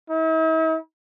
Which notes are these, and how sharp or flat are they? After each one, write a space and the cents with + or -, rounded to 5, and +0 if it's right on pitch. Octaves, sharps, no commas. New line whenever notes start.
E4 -45